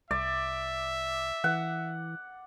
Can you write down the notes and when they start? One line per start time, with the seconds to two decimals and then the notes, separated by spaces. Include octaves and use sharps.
0.11 C2 D5 E5
1.44 E3 F#5